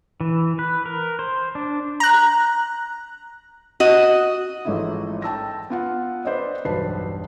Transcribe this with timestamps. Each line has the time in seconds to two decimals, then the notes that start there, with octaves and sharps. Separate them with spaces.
0.21 E3
0.59 B4
0.86 A#4
1.19 C5
1.55 D4
2.00 A#5 F#6
3.80 F#4 D#5
4.65 A1 G#2 F3 A3 D#4 E4
5.22 G5 A5 E6 A#6
5.70 B3 F4 F#5
6.25 B4 C5 D5 D#5
6.65 E1 B1 G2 B4 A5 C7